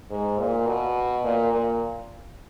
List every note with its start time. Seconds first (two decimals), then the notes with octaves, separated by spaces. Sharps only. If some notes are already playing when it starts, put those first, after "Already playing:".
0.10 G#2
0.39 A#2
0.67 B2
1.24 A#2
1.52 A#2